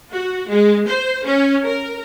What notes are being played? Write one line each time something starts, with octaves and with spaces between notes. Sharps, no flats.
F#4
G#3
C5
C#4
A#4